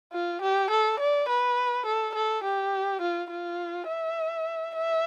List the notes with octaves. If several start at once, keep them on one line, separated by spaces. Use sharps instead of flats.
F4
G4
A4
D5
B4
A4
A4
G4
F4
F4
E5
E5